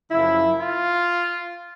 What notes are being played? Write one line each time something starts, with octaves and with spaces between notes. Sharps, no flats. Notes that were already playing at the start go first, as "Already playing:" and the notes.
F#2 C#3 F3 E4
F4